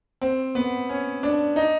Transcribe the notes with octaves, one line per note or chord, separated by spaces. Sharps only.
C4
B3
C#4
D4
D#4